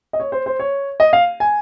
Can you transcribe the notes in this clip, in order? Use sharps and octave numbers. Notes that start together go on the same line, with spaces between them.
D#5
C#5
C5
C5
C#5
D#5
F5
G#5